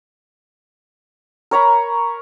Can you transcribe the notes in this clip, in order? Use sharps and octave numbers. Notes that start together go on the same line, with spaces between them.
A#4 C#5 A#5 B5